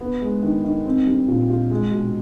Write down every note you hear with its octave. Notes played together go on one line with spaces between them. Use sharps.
B3
G#3
D#3
D#3
C4
G3
A#2
F4
G#3
B2